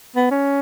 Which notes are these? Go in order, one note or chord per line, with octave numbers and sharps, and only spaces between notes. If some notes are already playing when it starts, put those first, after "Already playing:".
B3
C#4